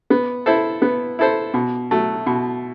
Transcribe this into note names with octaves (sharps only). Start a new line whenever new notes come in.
B3
E4 A4 C5
B3
E4 A4 C5
B2
F#3 A3
B2